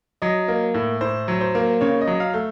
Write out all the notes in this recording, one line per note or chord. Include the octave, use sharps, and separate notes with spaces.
F#3 D#5
A#3
A2
A2 C5
F#3
C5
A#3
C#3 C#5
D#5
F#3
F5
A3